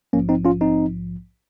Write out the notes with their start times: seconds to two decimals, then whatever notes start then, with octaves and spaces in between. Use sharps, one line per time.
0.13 A#1 G#2 F3 A#3 C#4
0.29 C4 D#4
0.45 C#4 F4
0.61 C4 D#4